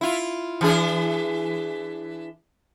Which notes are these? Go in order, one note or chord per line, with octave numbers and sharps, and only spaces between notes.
E4 F4
E3 D4 G#4